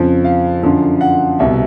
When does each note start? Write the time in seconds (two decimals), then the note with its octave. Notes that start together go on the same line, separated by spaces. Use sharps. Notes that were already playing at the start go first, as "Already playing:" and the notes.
Already playing: F2 C#3 F3
0.24 F5
0.63 F#2 D3 F3
1.01 F#5
1.39 C2 B2 E5